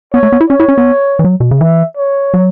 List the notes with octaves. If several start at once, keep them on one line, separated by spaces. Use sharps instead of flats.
B3 C#5
A3
B3
E4
C#4 C#5
E4
C#4
B3
E3
F#3
B2
C#3
E3 E5
C#5
F#3